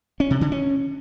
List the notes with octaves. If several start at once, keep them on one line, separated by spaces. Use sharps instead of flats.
C#4
C3
D3
C#4